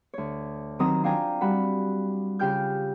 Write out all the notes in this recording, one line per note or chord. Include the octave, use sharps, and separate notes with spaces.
D2 C#5
D#3 F#3 C4 A#5 D#6
D4 F4 F5 G5 G#5 A#5
G3 F#4 F#5 B5
C#3 F4 G4 G5 F6 G6